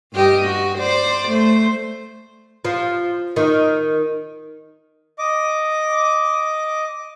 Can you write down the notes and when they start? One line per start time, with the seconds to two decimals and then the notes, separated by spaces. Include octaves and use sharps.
0.13 G2 G4 D#5
0.46 F#4
0.78 C5 D5
1.29 A3 C5
2.65 F3
3.36 D#3
5.19 D#5 D6